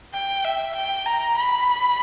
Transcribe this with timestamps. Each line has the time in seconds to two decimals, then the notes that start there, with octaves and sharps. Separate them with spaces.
0.14 G5
0.45 E5
0.75 G5
1.06 A#5
1.38 B5